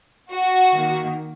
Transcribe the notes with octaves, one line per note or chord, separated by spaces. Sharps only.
F#4
D#3 A#3